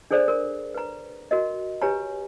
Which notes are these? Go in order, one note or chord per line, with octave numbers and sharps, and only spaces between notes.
D4 G#4 A4 C5 D5
A#4
B4 A#5
F#4 A#4 D#5
G4 B4 C#5 G#5 A#5